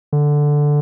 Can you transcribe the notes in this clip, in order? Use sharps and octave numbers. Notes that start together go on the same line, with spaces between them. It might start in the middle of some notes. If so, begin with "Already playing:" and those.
D3